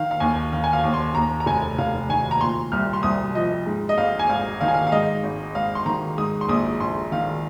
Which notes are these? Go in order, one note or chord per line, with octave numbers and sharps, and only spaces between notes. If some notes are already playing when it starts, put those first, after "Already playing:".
Already playing: D#3 F5
F5
D#2 G#5
D#3 F5
G#5
F5
D#2
C6
D#2 A#5
A#5
F1 G#5
F1 F5
D#3 G#5
A#5
A#2 C6
C2 F6
C6
C2 D#6
F3 D#5
G#2
D#5
G#1 F5
G#5
G#1 F5
D#3 F5
G#5
F5
F5
G#2 D#5
G#1
G#1 F5
C6
D#3 A#5
G#2 D#6
C6
A#1 D#6
A#1 C6
D#3 F5